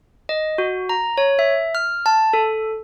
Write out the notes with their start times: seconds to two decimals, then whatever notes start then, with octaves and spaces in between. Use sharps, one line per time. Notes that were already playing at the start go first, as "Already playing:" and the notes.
0.29 D#5
0.58 F#4
0.89 A#5
1.18 C#5
1.39 E5
1.75 F6
2.06 A5
2.33 A4